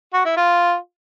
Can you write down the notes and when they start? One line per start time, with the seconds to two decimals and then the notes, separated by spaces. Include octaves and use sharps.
0.14 F#4
0.25 E4
0.37 F4